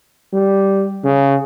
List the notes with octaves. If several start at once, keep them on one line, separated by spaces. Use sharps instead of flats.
G3
C#3